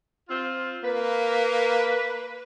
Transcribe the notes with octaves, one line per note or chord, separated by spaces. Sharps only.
C4 F4
A#3 B4